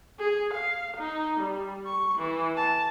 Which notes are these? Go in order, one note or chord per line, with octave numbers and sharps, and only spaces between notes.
G#4
F5
D#4
G3
C#6
E3
A5